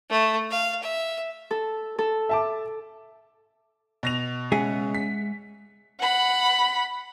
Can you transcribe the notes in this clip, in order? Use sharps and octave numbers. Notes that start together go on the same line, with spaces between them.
A3
F5
E5
A4
A4
E5 A5 D6
B2 A#6 F7
C#3 G#3 G#4 E5 F#5
B6
F#5 B5